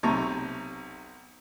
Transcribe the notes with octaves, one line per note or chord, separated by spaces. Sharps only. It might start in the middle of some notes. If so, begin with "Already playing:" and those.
B1 C3 A5 A#5 C#6